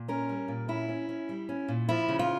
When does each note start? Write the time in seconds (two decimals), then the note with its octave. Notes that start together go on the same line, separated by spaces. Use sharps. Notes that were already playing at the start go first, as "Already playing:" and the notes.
Already playing: A#2
0.08 C#4 A#4
0.29 G3
0.48 A#2
0.68 C#4 E4
0.89 C#4
1.09 C#4
1.29 G3
1.49 C#4
1.68 A#2
1.89 F3 E4
2.09 C#3
2.19 F4